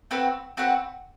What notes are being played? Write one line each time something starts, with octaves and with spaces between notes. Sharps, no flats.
C4 F#4 B4 F#5
C4 F#4 B4 F#5